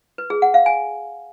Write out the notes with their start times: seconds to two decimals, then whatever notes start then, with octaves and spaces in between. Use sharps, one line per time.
0.18 B4
0.30 G#4
0.42 F#5
0.54 F5
0.66 G#5